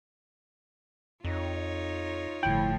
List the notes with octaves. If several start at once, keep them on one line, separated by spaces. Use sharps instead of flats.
F2 D#4 F4 C#5
G1 A2 F3 E4 G5